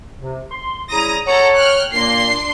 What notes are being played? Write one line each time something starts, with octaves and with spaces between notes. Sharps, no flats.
C3
C6
C#3 G3 E4 A#5 D#6 A#6
A4 C#5 F#5 A#5
G5 F6 F#6
A#2 A#3 D4 C6 C7